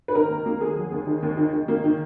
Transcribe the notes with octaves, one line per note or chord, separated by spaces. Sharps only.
B4
D#3 A#4
D#2
A#3
D#2 G#4
F#3
D#2
D#3
D#2
D#3
D#3
A#3
D#3